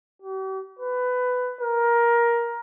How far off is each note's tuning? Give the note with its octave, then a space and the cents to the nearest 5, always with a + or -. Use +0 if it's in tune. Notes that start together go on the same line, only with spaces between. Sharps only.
G4 -45
B4 +15
A#4 +15